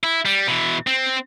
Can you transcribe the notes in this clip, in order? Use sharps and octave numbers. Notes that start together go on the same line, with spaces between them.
E4
G3
B2 E3
C4